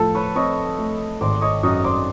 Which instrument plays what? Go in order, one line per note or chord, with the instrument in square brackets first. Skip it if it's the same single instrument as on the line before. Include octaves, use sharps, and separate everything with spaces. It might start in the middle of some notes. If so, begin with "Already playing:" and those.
Already playing: [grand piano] A2 F3 [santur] A4
[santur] B4 C#5
[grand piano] C4 [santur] C#5 D#5
[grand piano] A3
[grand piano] G#1 [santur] C5 D5
[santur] C#5 D#5
[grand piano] F#2 [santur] C#5 D#5
[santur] C5 D5